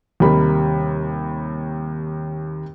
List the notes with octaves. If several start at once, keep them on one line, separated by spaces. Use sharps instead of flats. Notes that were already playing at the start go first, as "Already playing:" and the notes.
D#2 C3 G3 A#4 B5